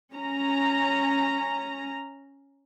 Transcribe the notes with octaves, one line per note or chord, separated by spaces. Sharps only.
C#4 A#5